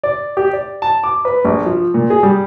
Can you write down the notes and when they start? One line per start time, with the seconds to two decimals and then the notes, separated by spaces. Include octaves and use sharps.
0.03 D5
0.37 G4
0.53 D5
0.82 A5
1.04 D6
1.25 B4
1.45 A#1
1.66 F3
1.94 A#2
2.10 G#4
2.23 G3